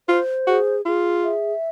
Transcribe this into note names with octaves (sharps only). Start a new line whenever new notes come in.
F4 C5
F#4 G#4
F4 G#4
E5